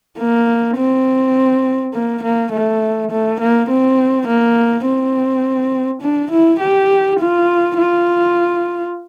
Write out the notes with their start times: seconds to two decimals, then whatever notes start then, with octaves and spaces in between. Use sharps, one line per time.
0.18 A#3
0.77 C4
1.94 A#3
2.23 A#3
2.52 A3
3.11 A3
3.40 A#3
3.69 C4
4.27 A#3
4.86 C4
6.02 D4
6.31 E4
6.60 G4
7.20 F4
7.78 F4